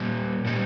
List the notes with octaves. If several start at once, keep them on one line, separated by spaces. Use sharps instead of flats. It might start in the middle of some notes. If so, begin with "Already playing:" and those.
Already playing: A#2 G3
A#2 G3